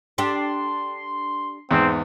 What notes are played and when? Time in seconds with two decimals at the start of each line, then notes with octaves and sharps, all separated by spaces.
0.18 D4 G4 A4 C6
1.71 E2 G#2 C4